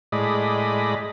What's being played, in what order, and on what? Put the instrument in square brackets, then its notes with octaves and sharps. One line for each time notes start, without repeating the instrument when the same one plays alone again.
[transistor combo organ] A2 G#3 D5 D#5 B5